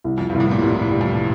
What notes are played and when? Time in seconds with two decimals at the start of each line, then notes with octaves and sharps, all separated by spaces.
0.04 C2
0.18 F2
0.30 C2 G2
0.40 A2
0.51 A#2
0.62 C2 C3
0.82 A2
0.91 G3
1.01 F2